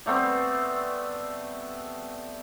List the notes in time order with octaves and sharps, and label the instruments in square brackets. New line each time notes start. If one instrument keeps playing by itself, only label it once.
[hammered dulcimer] G3 A3 B3 C4